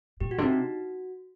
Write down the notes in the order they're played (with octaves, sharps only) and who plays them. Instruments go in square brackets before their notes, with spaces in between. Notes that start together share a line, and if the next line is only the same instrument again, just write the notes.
[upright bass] A#2 [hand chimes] G4
[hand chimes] F#4
[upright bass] D3
[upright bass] C3 [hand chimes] D#4
[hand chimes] F#4